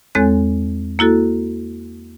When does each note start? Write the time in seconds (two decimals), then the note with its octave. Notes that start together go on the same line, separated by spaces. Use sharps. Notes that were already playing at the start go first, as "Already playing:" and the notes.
0.15 E2 G#3 C4 A4 C#5 F#6
0.99 A#3 E4 F#4 A4